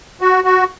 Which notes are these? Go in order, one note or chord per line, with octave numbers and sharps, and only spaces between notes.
F#4
F#4